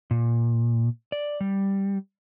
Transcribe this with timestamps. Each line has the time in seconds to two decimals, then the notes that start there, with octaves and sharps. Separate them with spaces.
0.11 A#2
1.12 D5
1.41 G3